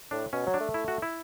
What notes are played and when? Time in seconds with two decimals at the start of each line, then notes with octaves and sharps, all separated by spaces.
0.11 A2 D4
0.33 B2 C#4
0.46 F#3
0.54 D4
0.60 A3
0.74 E4
0.88 F#4
1.02 E4